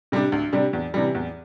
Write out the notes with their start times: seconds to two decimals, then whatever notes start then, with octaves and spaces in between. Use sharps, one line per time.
0.12 C3 G3 D4
0.32 D2
0.53 C3 G3 D4
0.73 E2
0.94 C3 E3 G3
1.15 E2